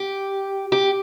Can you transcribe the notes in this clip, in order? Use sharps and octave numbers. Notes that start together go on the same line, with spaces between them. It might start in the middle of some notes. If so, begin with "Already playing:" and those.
Already playing: G4
G4